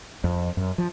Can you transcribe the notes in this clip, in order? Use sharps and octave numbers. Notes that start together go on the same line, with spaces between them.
F2
F#2
F3